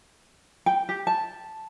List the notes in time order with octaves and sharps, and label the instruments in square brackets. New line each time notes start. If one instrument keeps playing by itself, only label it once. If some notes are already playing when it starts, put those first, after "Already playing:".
[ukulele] G5
G4
A5